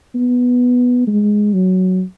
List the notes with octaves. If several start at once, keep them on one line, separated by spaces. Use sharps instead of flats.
B3
G#3
F#3